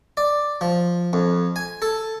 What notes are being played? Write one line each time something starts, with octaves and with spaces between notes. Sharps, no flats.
D5
F3
F2
G#5
A4